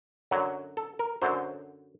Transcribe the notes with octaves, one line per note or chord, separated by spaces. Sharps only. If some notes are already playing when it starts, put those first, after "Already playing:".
F#2 D3 F#3
A4
A#4
F#2 D3 F#3 C5